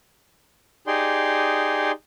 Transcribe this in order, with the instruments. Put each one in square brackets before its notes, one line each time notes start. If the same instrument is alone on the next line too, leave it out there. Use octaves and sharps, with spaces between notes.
[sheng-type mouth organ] D#4 G4 G#4 D5 C6